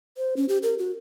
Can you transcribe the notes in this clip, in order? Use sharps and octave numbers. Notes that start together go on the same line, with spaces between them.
C5
C#4
G4
A#4
F#4